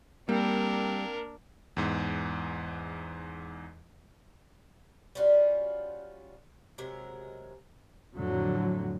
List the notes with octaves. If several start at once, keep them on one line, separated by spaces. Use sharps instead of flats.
G3 A#3 C4 D4 A#4
E2 G#2
G3 C#4 F4 F#4
C3 F#3 G#3 A#4
F2 A2 D3 F#3